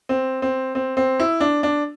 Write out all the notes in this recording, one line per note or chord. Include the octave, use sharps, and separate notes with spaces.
C4
C4
C4
C4
E4
D4
D4